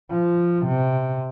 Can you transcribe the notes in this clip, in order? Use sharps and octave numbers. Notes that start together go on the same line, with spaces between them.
F3
C3